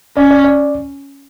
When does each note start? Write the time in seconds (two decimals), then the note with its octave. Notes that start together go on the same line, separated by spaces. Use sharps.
0.17 C#4 D5
0.31 D5
0.44 D5